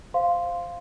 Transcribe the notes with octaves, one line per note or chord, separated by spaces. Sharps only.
C5 F5 C6